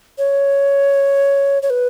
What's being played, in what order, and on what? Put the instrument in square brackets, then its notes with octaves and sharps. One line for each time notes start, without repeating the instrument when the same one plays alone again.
[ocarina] C#5
C#5
B4